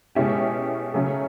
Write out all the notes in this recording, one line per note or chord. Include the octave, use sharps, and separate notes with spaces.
B2 G#3 C#4 E4 G4
C#3 F#3 A3 C#4